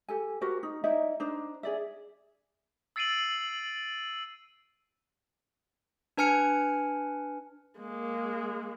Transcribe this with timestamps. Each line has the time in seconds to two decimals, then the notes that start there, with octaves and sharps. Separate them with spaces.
0.09 G4 A4 G#5
0.41 F#4 G4 A#4 C5
0.63 D#4
0.84 D#4 E4 D5 E5
1.20 D4 D#4 C5
1.63 G#4 D5 E5
2.96 E6 A6 C7 D7 D#7 F#7
6.17 D4 B4 G#5 F6 C#7
7.78 G#3 A#3